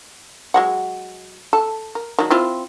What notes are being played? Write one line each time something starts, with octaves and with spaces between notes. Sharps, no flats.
F#3 G#3 F#5
A4
A#4
D#3 F#3
C4 E4 F4